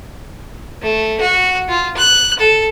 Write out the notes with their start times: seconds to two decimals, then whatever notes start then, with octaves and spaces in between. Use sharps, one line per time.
0.81 A3
1.20 F#4
1.68 F4
1.97 F#6
2.39 A4